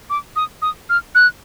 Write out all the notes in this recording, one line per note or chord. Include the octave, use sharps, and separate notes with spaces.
D6
D#6
D#6
F6
F#6